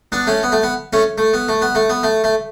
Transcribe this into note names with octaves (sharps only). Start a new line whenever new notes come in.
B3 D4
A3 C#4
B3
A3
B3
A3 C#4
A3
B3
A3
B3
A3
B3
A3
A3